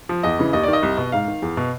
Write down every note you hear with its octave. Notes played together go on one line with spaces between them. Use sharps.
F3
E2 D#5
C#3 E3
D#2 D#5
D#3 D5
D#5
C2
B2
G#2 F5
D#3
E2
B2